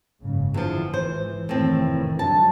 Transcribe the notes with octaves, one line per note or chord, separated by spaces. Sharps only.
F#1 G#2 C#3
E2 D3 F3
G#1 E3 C5
F1 A2 D#3 E3 C4
G2 D3 F#3 A5